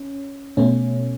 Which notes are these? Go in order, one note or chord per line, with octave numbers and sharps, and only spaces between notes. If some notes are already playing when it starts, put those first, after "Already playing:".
Already playing: C#4
B2 A3 C#4